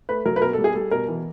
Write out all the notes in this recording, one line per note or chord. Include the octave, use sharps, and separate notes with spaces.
A3 B4
F#3 A#4
B4
B2 A#4
A4
G3
G#4
G3 A4
B2 A#4
E3